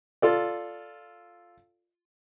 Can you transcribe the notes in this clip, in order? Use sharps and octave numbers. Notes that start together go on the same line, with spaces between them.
F4 A4 D5